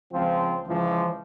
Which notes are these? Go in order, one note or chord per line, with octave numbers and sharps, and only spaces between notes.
C#2 F3 C4 F4
C#2 E3 F3